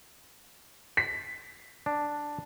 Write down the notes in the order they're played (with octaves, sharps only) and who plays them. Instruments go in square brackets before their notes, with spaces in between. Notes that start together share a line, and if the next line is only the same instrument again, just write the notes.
[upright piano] B6
[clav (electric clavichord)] D4